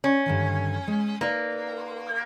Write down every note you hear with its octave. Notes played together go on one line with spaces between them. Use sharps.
C#4
G2 D3 D#3
G#3
A#3 D#4 B4 D5